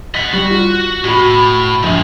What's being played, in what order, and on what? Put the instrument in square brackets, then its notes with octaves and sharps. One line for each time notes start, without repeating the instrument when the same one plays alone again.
[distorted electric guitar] D#5 F#5 [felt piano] B6
[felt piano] G3 [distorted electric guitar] F#4
[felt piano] F4
[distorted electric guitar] A2 [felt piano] F#4 B5
[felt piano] A#1 [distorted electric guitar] F3 G#3